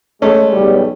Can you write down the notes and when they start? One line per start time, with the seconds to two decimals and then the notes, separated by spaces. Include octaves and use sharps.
0.22 G#3 A3 C#4
0.53 B1 C#3 G3